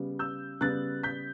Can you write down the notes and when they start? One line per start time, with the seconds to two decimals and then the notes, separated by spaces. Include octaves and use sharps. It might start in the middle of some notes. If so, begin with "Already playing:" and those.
Already playing: C#3 G3 B3
0.19 E6 G6
0.61 C#3 G3 B3 F#6 A6
1.03 G6 B6